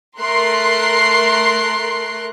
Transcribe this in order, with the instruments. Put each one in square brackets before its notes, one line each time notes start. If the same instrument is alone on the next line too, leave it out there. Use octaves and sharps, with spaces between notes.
[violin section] A3 A#4 C6 F#6 C7